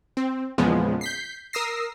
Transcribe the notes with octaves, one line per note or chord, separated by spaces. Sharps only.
C4
E2 A#2 C#3 F3 G#3 B3
G6 B6 C7
A#4 D#6 E6 A#6 C7